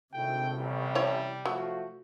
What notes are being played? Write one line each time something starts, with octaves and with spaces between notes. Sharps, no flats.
G#1 D2 A2 C3 G5
A1 G3
E4 C5 C#5
F3 F#3 A3 F#4